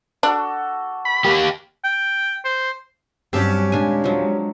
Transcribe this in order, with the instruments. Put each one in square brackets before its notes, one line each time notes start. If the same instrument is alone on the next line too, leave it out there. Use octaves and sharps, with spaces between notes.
[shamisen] D4 [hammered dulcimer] F#4 A4 D6
[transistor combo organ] B5
[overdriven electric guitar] A#3 G4
[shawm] G5
C5
[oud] G2 F#3 [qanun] C4 A5 [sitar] C#4 G4
[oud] D#2 A#2 [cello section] G#3 [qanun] D4 G#5
[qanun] F3 F#3